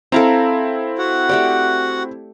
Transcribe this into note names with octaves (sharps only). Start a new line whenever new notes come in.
C4 E4 A4 F5 A#5
F#4 F#5
A3 G4 D5